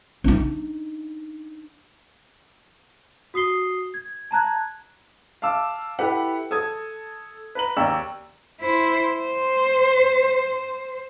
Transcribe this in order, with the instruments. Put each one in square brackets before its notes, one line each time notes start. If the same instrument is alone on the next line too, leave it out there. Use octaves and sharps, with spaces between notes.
[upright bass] D4 D#4
[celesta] F#4 D#6 C7 G7
G#6
A5 A#5 F#6 G#6
[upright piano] F5 A5 D6 E6
E4 G4 A4 B4 F#5
A4 D#6 G#6
B4 A#5 F#7
D#2 D5 G5 A#5 E6
[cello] E4 C5
C5